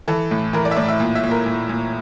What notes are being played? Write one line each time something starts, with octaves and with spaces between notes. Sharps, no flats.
E3 A4
A2
E3 A#4
D5
E5
A2 D5
E5
A#2
E5
A#2
A#4
A#2
A#2